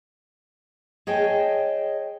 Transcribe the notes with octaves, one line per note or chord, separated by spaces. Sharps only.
G#4 C#5 D#5 G5 A5